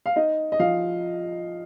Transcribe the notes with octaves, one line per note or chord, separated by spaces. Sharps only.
F5
D#4 D#5
D#5
F3 F5